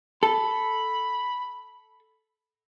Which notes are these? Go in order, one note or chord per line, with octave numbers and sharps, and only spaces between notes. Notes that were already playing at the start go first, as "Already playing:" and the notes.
A4 B5